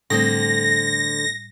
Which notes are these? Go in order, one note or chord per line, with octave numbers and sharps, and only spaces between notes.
A2 D3 G3 A3 C4 D#6 A#6